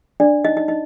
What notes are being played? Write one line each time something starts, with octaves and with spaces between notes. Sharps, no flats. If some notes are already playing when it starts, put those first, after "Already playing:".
D4 D5
D#4 D#5
D#4 D#5
D#4 D#5